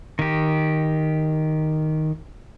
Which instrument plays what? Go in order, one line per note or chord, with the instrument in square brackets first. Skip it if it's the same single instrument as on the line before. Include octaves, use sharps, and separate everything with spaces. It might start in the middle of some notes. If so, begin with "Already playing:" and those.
[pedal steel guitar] D#3 G4